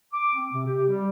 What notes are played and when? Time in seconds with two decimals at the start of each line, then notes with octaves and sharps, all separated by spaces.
0.13 D6
0.35 C4
0.53 C3
0.66 G4
0.89 G3